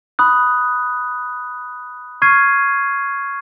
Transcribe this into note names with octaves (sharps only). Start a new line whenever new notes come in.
B5 D#6 F#6
C#6 F6 G#6 C7 D#7